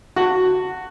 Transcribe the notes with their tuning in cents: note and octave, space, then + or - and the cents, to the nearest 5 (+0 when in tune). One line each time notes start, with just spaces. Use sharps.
F#4 +0 F#5 +5 A5 +25